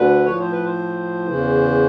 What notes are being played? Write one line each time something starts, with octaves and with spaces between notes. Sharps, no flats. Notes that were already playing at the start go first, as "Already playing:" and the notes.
Already playing: D2 D3 B4
A2 F3 C#5
C5
B4
C5
E2 C#3 E3